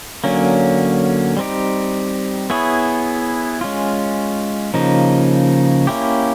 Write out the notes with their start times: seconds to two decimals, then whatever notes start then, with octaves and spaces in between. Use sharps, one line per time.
0.24 D3 F#3 A#3 C#4
1.37 G3 C4 D#4 G4
2.50 B3 E4 G#4 C#5
3.61 G#3 C#4 F4
4.74 C#3 F3 A#3 D#4
5.87 A#3 C#4 E4 G4